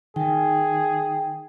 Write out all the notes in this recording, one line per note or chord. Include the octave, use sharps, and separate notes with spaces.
D#3 G#4 G5